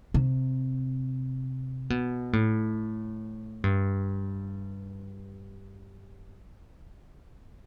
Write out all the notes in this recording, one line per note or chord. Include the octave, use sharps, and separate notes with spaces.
C3
B2
A2
G2